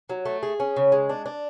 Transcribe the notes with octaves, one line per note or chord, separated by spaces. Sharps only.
F#3
A3
G#4
C#4
C#3
G#3
D4
D4